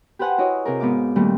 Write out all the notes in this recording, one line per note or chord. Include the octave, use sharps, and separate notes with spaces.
G4 B4 C5 F#5 G#5
E4 F#4 C#5 D#5
C3 G#4 A#4
G#2 B3 F5 D6
A#2 D#3 G3 A3 C4